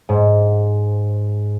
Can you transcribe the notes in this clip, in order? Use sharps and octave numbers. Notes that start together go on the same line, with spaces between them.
G#2